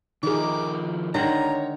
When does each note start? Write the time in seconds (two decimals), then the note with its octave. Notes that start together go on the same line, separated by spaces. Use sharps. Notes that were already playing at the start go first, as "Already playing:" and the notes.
0.23 D#3 F3 D#4 G#4 A#4 D6
1.15 D3 D#3 G#3 C#5 A#5